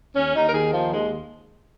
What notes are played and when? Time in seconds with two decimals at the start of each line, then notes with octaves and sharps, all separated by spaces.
0.15 D#2 C#4
0.35 D#2 D#4
0.49 A#4
0.54 D#3 G#4
0.73 D#2 F3
0.93 D#2 G#3